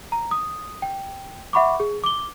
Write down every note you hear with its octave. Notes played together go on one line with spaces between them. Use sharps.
A#5
D#6
G5
E5 F#5 B5 C#6 D6
G#4
D6 G7